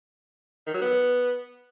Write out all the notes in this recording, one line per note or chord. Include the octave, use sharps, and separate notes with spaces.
D#3
F#3
B3